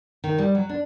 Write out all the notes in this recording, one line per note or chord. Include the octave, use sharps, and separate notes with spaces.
D#3
G3
F#3
D4